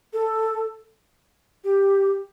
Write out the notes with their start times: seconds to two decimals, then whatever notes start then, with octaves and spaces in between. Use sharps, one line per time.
0.13 A4
1.64 G4